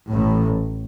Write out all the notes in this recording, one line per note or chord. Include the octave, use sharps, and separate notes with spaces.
A1 A2